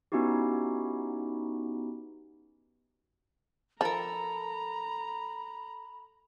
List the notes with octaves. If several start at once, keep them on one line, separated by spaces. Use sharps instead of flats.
B3 C#4 D#4 E4 F#4 G4
F3 A4 A#4 A#5 B5